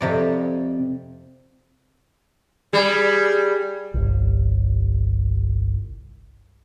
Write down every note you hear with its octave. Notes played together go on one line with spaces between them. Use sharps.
F2 C3 D5
G3 G#4
G1 C2